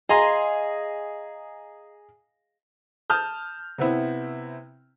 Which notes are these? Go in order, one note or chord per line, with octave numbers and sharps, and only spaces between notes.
G#4 D#5 F5 A#5 C6
A5 D#6 F6 G6
C3 B3 C4 E4